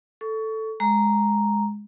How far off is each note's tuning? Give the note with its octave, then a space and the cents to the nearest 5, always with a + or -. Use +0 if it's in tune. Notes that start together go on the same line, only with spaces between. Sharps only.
A4 +0 C#6 +25
G#3 +0 A#5 +0